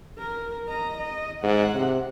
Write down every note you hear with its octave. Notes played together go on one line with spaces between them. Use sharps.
A#4
D#5 A#5
D#5
G#2 F#5
C3